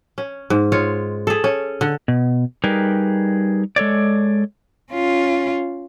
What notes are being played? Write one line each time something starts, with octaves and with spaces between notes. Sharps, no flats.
C#4
G#2
G#3 F4 C#5
G#4 A4
C#4
D3
B2
G3 D#4 G4 G#4 A#4 B4
G#3 A4 C#5 D5
C#4 F4